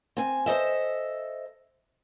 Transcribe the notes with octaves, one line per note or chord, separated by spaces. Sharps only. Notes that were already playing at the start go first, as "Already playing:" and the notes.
C4 G#5
A4 C5 D#5 E5